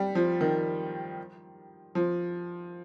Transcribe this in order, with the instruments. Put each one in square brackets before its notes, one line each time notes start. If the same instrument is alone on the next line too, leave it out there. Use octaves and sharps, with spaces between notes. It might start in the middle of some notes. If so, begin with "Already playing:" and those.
Already playing: [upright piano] G3
F3
D#3
F3